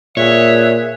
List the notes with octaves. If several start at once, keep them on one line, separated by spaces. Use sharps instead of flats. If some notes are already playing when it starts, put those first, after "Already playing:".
A#2 G#4 C#5 E5 F#6